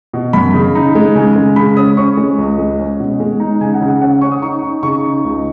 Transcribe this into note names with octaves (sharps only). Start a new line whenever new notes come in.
B2
F#2 B5
C#3
D#4
G#3
C#3 G#5
G#3
C#3 B5
C#4 D#6
C#4 C#6
G#3
C#2
G#3
C#4
B2
G#3
D#4
C#3 G#5
F#5
C#3
F#5
C#4 F#5
F#5
C#4 C#6
D#6
D#4 C#6
D#4
C#3 C#6
D#4
C#2